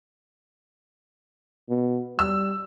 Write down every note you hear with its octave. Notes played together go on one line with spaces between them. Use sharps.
B2
G3 E6